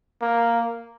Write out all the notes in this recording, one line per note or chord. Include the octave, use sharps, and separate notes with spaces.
A#3